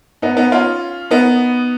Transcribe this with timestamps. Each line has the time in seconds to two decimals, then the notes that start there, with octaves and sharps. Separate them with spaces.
0.22 B3 D#4
0.37 B3 D#4
0.52 C#4 F4
1.11 B3 D#4